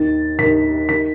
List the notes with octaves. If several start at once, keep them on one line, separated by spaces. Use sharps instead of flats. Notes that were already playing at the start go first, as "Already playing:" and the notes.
Already playing: D#2 D#3 A6
D#2 D#3 B6
D#3 B6